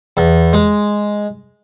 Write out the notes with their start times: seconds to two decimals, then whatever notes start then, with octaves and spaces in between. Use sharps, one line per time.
0.17 E2
0.53 G#3